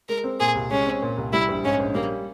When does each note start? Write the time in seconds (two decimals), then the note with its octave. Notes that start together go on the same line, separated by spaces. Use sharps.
0.09 G#3 A#4
0.24 C4
0.40 A#2 G#4
0.55 C2
0.71 G#3 C#4
0.86 C4
1.02 A#2
1.17 C2
1.33 G3 E4
1.49 A#1
1.64 G#2 C#4
1.80 A#1
1.95 G3 A#3